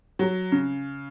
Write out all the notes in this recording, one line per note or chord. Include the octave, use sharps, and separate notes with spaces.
F#3
C#3